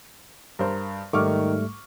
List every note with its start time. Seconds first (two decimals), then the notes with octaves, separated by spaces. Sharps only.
0.59 G2 A#4 C5
1.13 G#2 D#3 G3 A3 C#6 D6 F6